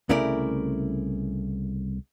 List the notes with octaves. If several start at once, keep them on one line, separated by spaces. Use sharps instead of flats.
C2 C#3 A3 E4 A#4 D5